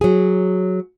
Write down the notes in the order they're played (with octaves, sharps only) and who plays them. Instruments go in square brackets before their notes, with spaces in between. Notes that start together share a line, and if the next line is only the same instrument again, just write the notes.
[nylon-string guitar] F#3 G#4